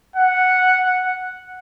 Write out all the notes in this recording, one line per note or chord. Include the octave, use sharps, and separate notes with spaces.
F#5